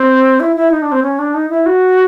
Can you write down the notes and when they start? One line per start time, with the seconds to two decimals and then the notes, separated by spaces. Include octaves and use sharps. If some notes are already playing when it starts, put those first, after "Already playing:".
Already playing: C4
0.40 E4
0.56 E4
0.71 D#4
0.82 D4
0.92 C4
1.03 C#4
1.19 D4
1.34 D#4
1.49 E4
1.66 F#4